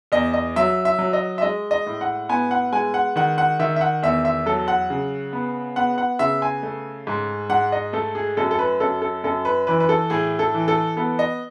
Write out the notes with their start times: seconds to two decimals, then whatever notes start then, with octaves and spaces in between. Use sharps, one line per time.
0.12 E2 D#5
0.33 D#5
0.56 F#3 E5
0.85 E5
0.99 F#3
1.13 D#5
1.38 E5
1.42 G#3 D#5
1.71 D#5
1.87 A2
2.01 F#5
2.29 B3 G#5
2.51 F#5
2.72 G#3 G#5
2.94 F#5
3.16 D#3 F#5
3.38 F#5
3.59 D#3 E5
3.76 E5
3.81 F#5
4.03 E2 E5
4.25 E5
4.46 F#3 A4
4.68 F#5
4.90 C#3
5.33 B3
5.76 B3 F#5
5.98 F#5
6.19 C#3 E5
6.42 G#5
6.63 A3
7.07 G#2
7.50 G#2 F#5
7.72 D#5
7.93 A3 A4
8.15 G#4
8.37 F#2 A4
8.51 A4
8.59 B4
8.80 F#2 A4
9.02 A4
9.24 F#2 A4
9.45 B4
9.67 E3 B4
9.80 B4
9.89 A4
10.10 A2 G#4
10.39 A4
10.54 E3
10.68 A4
10.97 B3 A4
11.19 D#5